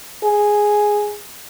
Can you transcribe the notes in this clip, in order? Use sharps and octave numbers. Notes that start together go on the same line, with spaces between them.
G#4